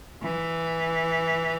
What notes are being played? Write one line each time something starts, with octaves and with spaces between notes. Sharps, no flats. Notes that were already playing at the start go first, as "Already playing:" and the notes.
E3